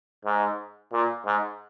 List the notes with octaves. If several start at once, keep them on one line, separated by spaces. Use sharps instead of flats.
G#2
A#2
G#2